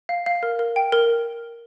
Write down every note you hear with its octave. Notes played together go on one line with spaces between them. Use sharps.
F5
F5
A#4
A#4
G5
A#4